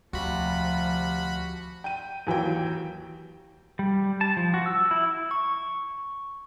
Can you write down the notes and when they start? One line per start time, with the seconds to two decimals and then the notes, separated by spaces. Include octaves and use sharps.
0.13 D2 C3 F3 G3 F4 F#4 B5
1.84 G5 D#7
2.27 D#2 E3 F#3 G5
3.79 G3
4.21 A5
4.37 F3
4.54 F#4
4.66 E6
4.91 E4
5.31 C#6